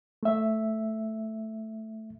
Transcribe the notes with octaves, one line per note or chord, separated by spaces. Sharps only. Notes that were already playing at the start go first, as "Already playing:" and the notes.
A3 E5